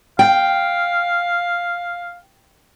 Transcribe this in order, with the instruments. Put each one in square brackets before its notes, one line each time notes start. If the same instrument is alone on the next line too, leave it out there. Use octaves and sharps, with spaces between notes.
[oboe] F5 [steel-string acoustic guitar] G5